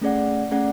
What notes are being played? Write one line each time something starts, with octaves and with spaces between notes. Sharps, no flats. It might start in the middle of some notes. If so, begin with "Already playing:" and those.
A3 C#4 G#4 D5 F#5
A3 C#4 G#4 D5 F#5